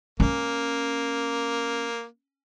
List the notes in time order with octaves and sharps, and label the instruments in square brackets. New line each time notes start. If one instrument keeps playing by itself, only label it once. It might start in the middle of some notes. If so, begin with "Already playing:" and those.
[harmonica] A#3 [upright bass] C#4